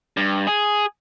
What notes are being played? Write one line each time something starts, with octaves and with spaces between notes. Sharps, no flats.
G2
G#4